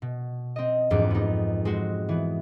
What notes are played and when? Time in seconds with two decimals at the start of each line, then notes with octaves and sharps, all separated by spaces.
0.02 B2
0.56 C4 D#5
0.90 E1 F2 G#2 D6
1.11 B3 D#4
1.65 G#3 C4 F#4
2.09 E3 B3